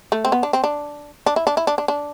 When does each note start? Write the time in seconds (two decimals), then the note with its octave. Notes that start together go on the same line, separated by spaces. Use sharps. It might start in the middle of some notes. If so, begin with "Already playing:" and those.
0.12 A3
0.25 C4
0.32 B3
0.43 D4
0.53 C4
0.64 D4
1.26 D4
1.36 E4
1.47 D4
1.57 E4
1.67 D4
1.78 D4
1.88 D4